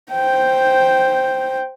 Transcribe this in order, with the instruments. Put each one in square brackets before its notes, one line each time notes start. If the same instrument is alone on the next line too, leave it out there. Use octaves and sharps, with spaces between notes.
[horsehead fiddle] C5 G5